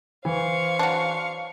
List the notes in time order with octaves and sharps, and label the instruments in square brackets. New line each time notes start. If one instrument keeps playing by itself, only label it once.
[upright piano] E3 [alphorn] C5 [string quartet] F5 C#6
[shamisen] F#3 D4